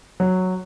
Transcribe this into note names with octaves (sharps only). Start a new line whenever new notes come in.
F#3